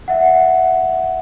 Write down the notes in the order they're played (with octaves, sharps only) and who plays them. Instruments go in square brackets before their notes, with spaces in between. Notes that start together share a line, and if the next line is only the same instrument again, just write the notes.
[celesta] E5 F#5